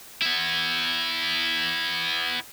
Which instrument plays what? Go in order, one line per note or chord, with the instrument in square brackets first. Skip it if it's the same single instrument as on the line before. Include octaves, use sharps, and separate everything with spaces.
[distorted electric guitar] B3 E4